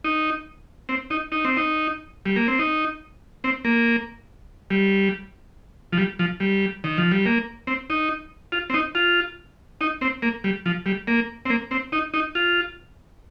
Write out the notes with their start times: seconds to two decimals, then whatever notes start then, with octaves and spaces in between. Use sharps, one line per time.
0.04 D#4
0.89 C4
1.10 D#4
1.32 D#4
1.45 C4
1.57 D#4
2.26 G3
2.36 A#3
2.48 C4
2.59 D#4
3.44 C4
3.65 A#3
4.70 G3
5.92 F3
5.98 G3
6.19 F3
6.40 G3
6.84 D#3
6.98 F3
7.11 G3
7.26 A#3
7.67 C4
7.90 D#4
8.52 F4
8.70 C4
8.74 D#4
8.95 F4
9.81 D#4
10.01 C4
10.22 A#3
10.44 G3
10.66 F3
10.86 G3
11.07 A#3
11.46 C4
11.50 A#3
11.71 C4
11.92 D#4
12.14 D#4
12.35 F4